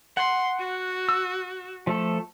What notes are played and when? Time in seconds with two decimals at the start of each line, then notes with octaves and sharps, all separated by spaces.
0.17 F#5 C6
0.59 F#4
1.09 E6
1.87 F3 A3 A4